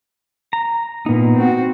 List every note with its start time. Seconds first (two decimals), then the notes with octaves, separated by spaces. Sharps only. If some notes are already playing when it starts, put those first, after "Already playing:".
0.53 A#5
1.06 A#2 B3 D#4
1.37 C4 F#4